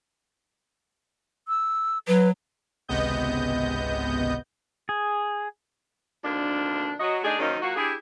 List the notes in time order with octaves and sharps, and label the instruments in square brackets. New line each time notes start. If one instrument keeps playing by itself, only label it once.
[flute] E6
[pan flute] F#3 [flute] B4
[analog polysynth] G#1 C#2 C3 B3 D#5 G6
[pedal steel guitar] G#4
[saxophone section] D2 C3 D#3 A#3 D4
F#3 F#4 D#5
A3 D4 D#4 G#4
D#3 F3 F#3 A#3 C#4 D#4
F#3 A#3 F4 F#4
D4 E4 G4 G#4